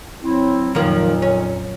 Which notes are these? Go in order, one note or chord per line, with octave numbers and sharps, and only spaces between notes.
F#3 C4 E4
F2 A#2 D#3 F3 F#3 A#3
C#4